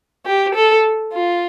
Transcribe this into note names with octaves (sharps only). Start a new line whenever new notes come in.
G4
A4
F4